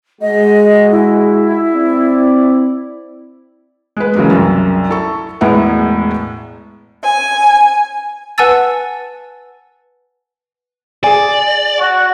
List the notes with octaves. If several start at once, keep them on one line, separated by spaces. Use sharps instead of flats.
G#3 F#4 D#5
E4
C4 D5
G#3 B4
C#3 E3 F#3 G#3 A#3
C2 F#2
E4 A4 C#6
E1 A2 G#3 B3 E4 F#5
G#5
B4 F#5 G#5 A5 E6 A6
G#4 D5 G#5
F#4